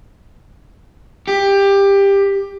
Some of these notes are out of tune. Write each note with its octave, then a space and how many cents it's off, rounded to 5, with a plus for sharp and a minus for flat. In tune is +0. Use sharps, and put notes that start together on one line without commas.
G4 +15